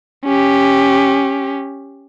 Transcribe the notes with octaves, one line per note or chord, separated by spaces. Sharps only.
C#4 G4